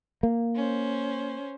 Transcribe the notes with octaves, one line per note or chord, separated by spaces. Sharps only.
A#3
C#4 C5